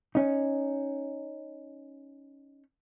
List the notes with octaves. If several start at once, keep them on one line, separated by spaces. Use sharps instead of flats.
C#4 D#4